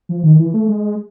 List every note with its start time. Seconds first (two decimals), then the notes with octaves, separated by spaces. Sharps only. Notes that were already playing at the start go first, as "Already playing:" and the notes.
0.09 F3
0.23 D#3
0.39 E3
0.54 A3
0.68 G#3